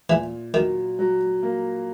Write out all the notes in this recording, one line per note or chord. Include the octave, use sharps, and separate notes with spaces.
A#2 E3
D#3 F#3
F#3
A#3